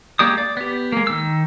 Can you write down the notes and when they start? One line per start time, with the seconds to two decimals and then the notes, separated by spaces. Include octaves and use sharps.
0.19 G#3 A#3 G4 D5 D#6
0.38 D5
0.57 B3 G4
0.92 G#3 A#3
1.07 D#3 E6